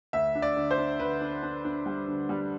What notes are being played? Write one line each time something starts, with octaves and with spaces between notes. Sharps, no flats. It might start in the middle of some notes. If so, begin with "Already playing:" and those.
D2 E5
D4
D5
D3
C5
D4
D3 B4
D4
D4
D4
G3
D3
G3